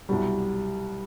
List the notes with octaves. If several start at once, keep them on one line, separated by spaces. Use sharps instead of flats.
C2 B2 F#3 G3